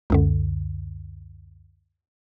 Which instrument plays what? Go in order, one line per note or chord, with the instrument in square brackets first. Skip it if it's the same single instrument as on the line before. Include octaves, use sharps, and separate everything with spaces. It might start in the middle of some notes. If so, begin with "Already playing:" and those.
[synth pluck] C#2 F#2 D3